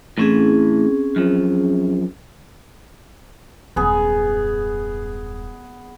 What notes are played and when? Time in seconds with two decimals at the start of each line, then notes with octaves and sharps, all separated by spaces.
0.18 A2 E3 C4 C#4 G#4
1.16 F#2 F3
3.76 D#1 F#2 B3 G#4